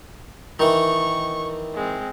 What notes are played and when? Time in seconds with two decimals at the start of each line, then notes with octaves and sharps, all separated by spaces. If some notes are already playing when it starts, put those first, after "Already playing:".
0.59 D#3 E3 C#6
1.74 G#3 C4